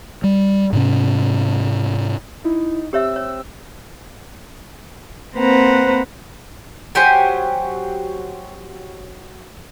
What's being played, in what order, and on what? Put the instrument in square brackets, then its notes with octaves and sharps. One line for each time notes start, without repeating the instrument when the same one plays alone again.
[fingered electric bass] G3
G#2 C3 C#4
[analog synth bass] D#4 [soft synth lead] E4
[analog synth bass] C4 [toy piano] G4 C#5 E5 [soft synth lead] E6
[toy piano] C#5
[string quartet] A#3 C4 B4 C5 F#5 A#5
[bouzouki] F#3 G4 C5 G#5